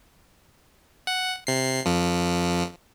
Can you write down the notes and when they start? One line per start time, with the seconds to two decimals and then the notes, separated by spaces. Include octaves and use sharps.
1.07 F#5
1.47 C3 C7
1.86 F2 F3